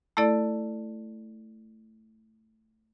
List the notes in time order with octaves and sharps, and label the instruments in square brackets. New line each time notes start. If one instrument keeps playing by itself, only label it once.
[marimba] A3 E4 A4 D5